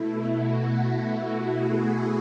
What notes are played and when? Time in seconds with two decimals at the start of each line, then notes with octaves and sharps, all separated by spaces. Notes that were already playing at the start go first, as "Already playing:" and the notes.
Already playing: B2 A3 E4
0.28 F#4
1.51 E4 G#4